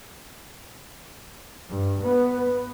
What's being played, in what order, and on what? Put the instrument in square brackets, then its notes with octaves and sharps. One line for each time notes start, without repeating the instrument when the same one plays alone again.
[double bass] G2
[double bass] B3 [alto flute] B4